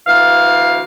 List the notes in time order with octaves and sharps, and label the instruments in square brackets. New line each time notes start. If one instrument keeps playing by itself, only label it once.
[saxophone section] D2 E3 F5